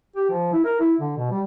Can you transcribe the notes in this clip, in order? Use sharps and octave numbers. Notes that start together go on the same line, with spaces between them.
G4
F3
E4
A#4
E4
D3
B2
G3